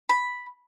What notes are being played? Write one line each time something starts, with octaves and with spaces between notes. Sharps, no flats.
B5